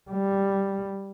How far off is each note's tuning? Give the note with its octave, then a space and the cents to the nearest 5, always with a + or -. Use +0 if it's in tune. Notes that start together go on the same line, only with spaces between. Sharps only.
G3 +0